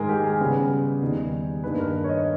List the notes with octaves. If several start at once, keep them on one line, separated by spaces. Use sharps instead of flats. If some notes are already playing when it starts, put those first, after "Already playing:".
Already playing: G#2 D#3 G#3 G#4 A#4
G4
G#4
C#3 G3 B3
E2 D#3 G3
G2 D#3 A#3 B4
A#4
C#5
D#5